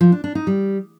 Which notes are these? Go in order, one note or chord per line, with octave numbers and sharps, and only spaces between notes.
F3
D4
D4
D#4
G3